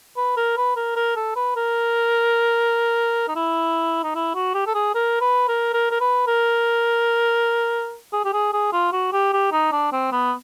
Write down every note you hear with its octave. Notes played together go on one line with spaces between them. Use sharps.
B4
A#4
B4
A#4
A#4
A4
B4
A#4
D#4
E4
D#4
E4
F#4
G4
A4
G#4
A#4
B4
A#4
A#4
A#4
B4
A#4
G#4
G4
G#4
G#4
F4
F#4
G4
G4
D#4
D4
C4
B3